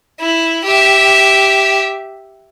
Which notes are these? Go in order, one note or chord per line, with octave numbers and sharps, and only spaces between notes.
E4
G4 E5